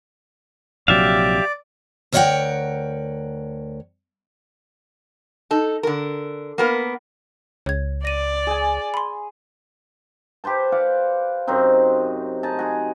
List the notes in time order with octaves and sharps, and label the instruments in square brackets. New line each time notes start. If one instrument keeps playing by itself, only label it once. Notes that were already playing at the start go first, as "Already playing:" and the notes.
[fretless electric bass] A#1 C3 F#3 [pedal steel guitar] G4 E5 F5 [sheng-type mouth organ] D5
[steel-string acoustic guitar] D2 A#4 C#5 D#5 F#5 G5
[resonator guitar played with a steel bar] D#4 A4
D3 A#4
A#3 B3 A#4
[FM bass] C#2 [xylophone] C#5 G#6
[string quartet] D5 [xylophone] A#6 D#7
[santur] G#4 G#5
[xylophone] B5 C6
[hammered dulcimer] G4 B4 C5 A5
D5 F5 F#5
F#2 C3 C4 D#4
D#4 G#4 A5
F#4 G#4